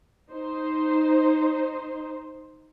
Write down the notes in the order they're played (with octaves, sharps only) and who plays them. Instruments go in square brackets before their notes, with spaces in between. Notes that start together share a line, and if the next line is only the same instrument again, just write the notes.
[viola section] D#4 C5